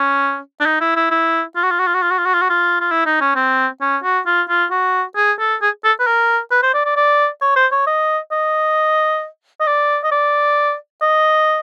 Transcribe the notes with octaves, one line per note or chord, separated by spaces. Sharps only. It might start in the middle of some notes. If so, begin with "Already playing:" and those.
Already playing: C#4
D4
D#4
E4
E4
E4
F4
F#4
F4
F#4
F4
F#4
F4
F#4
F4
F#4
F4
F#4
F4
F4
E4
D#4
C#4
C4
C#4
F#4
F4
F4
F#4
G#4
A4
G#4
A4
B4
A#4
B4
C5
D5
D5
D5
C#5
C5
C#5
D#5
D#5
D#5
D5
D#5
D5
D#5